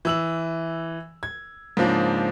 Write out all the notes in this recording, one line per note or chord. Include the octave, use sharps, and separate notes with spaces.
E3 E6 F#7
G#6
G#2 C#3 F3 A#3 D4